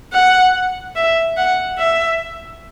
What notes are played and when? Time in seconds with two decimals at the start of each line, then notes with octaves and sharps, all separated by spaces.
0.13 F#5
0.96 E5
1.37 F#5
1.78 E5